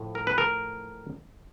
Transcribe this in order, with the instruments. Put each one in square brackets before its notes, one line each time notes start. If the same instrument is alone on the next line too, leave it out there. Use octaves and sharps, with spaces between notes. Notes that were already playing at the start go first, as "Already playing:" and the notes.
Already playing: [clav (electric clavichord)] A2 F3
A#4
B4
A#4